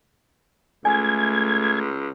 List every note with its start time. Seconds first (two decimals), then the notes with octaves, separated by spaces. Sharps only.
0.85 C#2 A3 G#5 G#6